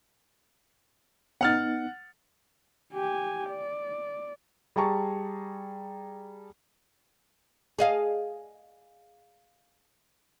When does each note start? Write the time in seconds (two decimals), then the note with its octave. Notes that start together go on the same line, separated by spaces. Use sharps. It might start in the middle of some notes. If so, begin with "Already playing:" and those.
1.41 B3 D#4 F#5 F6 A6
2.93 G4 G#5
3.50 D5
4.76 G3 G#4 A5 A#5 C#6
7.79 G#4 D#5 F5